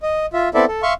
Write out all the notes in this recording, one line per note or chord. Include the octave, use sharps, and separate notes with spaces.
D#5
F4 E5
B3 C4 E4 A4 D5 E5
A4
E5 F5 C6 C#6